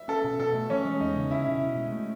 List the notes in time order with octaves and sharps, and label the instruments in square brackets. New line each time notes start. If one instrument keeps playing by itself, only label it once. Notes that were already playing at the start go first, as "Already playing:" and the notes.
Already playing: [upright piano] E5
[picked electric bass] C#4 [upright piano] A4
[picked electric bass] B2
[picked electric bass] B2 [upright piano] A4
[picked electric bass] A3
[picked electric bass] E3 [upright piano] C#4
[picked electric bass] G#3
[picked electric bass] E2 [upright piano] D#4
[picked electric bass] C#3
[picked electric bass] C#4 [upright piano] E4
[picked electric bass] B2
B2
G#3
A3